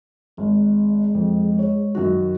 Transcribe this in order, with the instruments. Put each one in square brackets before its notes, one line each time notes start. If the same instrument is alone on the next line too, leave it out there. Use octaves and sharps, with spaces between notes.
[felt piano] G#1 [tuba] G#3
[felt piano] F2
C#5
F#2 D#3 F#4